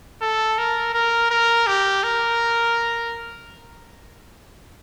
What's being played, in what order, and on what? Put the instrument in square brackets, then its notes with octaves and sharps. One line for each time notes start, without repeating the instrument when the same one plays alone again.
[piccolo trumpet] A4
A#4
A#4
A#4
G4
A#4